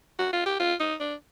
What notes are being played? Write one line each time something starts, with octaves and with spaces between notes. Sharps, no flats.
F#4
F4
G4
F4
D#4
D4